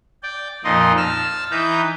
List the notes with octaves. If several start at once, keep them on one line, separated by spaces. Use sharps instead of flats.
D5 G5
F2 A#2 F3 D#4 D#5 C6
A5 E6 F6
E3 D#4 B4 A#5 G6